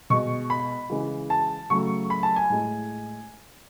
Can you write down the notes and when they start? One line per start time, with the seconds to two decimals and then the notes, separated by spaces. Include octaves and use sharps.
0.10 B2 G#3 C#6
0.50 B5
0.90 C#3 E3 G#3
1.30 A5
1.70 C#3 F#3 A3 C#6
2.10 B5
2.23 A5
2.36 G#5
2.50 A2 G#3